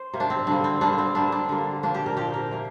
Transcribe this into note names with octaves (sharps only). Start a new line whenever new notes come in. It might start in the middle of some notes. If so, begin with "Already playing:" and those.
Already playing: C5
C3 A#3
D4
C4
D3 G3 A#3 D4
C4
D3 G3 A#3 D4
C4
D3 G3 A#3 D4
D4
D3 G3 A#3
A#2 F3 A#3 D4
G4
A#4
A#2 F3 A#3 G4
A#4
C3 A#3